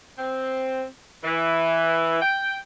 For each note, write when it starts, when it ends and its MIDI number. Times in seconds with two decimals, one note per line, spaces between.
0.18 0.84 60
1.24 2.21 52
2.22 2.55 79